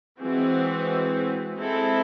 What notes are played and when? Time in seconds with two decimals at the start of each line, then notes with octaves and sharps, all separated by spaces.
0.20 E3 G#3 C4 F#4
1.56 G#3 C4 E4 A4